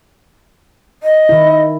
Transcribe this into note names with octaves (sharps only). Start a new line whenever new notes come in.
D#5
D#3 E4